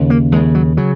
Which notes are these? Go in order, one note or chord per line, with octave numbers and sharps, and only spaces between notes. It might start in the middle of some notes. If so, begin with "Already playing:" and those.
Already playing: D#2 C#3
A#3
D#2 C#3 G#3
F#3
C#3 F#3